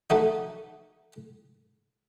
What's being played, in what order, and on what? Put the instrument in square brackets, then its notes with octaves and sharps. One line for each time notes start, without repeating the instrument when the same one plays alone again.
[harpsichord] A3 D#4 F#4